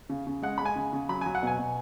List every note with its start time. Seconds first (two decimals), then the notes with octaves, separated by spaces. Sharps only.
0.09 C#3
0.27 C#3
0.42 G#3 F#5
0.58 G#3 B5
0.65 G#5
0.76 C#3
0.93 C#3
1.09 F#3 B5
1.21 F#3 G#5
1.35 F#5
1.43 B2 G#5
1.59 B2